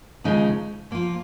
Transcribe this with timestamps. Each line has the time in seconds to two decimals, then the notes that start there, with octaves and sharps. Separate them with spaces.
0.24 D#2 C#3 F3 G#3 D#4
0.91 F3 A#3 F4